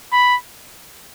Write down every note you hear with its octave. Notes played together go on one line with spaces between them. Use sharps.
B5